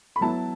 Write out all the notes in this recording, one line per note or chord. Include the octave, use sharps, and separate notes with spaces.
B5
F#3 B3 E4 A5